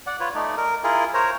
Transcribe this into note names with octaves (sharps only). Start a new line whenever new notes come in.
D5 F#5
F4 B4 C#5
A3 D#4 D5
A#4
E4 F4 G#4 A#4
A#4 C5 C#5 A#5